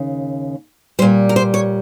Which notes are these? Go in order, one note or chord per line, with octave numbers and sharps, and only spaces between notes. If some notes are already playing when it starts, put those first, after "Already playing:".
Already playing: D#2 C#3
A#2 G3 C5
A#4
C5
C#5